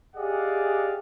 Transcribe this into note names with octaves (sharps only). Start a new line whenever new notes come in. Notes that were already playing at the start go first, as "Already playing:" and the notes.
G4 G#4 D5 D#5 F5 F#5